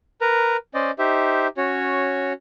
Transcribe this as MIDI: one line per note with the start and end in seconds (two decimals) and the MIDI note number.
0.21 0.57 70
0.21 0.57 71
0.21 0.57 82
0.74 0.91 61
0.74 0.91 72
0.74 0.91 74
0.74 0.91 75
0.99 1.48 63
0.99 1.48 67
0.99 1.48 72
0.99 1.48 76
1.57 2.33 61
1.57 2.33 66
1.57 2.33 73